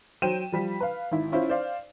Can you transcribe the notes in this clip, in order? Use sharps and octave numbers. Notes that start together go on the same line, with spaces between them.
F#3 C5 G5 D#7 E7
F3 G3 B6
B4 F5
G#1 E4
C#4 E4 F4 C5
C5 D5 F5